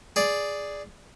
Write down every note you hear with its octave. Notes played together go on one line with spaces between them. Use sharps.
G#4 D5